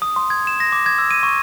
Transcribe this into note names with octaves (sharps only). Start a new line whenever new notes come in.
D#6
C6
G#6
E7
A#6
D6
G#6
E6
D#7
C#6